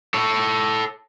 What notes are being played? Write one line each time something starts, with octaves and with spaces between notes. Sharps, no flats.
A4 C#5